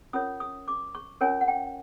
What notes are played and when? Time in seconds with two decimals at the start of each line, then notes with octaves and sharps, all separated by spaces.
0.13 C#4 F4 A#4 C#5 D#6
0.40 D#6
0.68 D6
0.95 C#6
1.21 C#4 F4 A#4 C#5 G#5
1.41 F#5
1.48 G5